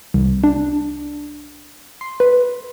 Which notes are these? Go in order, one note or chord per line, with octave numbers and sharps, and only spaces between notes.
C2
D4
C6
B4